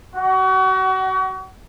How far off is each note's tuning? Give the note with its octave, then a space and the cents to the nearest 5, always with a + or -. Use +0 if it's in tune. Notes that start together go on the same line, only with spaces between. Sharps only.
F#4 +35